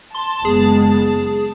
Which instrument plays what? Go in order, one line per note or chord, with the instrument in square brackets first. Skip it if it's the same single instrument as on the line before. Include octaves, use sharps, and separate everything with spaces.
[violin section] A5 [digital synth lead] C6
[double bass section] F#1 G#3 B3 [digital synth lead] G#4